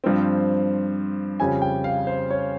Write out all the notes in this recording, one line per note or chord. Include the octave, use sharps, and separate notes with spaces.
G2 F3 C4
F2 C#3 G3 C#4 G#5
G5
F5
C5
C#5